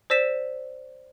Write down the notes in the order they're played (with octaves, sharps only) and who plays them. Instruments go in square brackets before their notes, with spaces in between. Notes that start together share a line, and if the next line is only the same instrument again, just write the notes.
[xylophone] C5 D5 E6 A#6 B6 E7